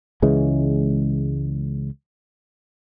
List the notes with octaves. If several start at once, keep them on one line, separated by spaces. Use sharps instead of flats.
C#2 C#3 E3 G#3